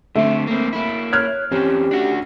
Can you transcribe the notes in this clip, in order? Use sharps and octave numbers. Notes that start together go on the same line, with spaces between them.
D3 A3 C4 E5
A#3 C4
A#3 E4
C#5 F6 F#6 G#6
E2 C4 C#4 G4
D4 F#4